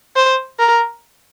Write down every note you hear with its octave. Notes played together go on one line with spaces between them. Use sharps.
C5
A#4